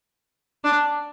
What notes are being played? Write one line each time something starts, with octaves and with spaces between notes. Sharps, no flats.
D4